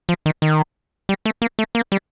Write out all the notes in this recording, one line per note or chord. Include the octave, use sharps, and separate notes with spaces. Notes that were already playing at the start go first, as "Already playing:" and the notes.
F3
D#3
D#3
G3
A3
A#3
A3
A#3
G3